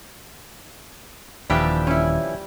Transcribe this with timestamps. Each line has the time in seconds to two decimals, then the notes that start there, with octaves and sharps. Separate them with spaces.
1.50 D#1 D#2 E3 F3 G3 D4 G4 E5
1.87 C#4 E4